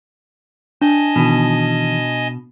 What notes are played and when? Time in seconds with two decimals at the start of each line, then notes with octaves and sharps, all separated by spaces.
0.82 D4 D#5 G#5 A5
1.16 B2 D#3 E3